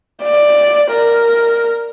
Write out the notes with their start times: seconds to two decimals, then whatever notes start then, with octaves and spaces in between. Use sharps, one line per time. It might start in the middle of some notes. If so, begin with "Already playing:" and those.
0.23 D5
0.91 A#4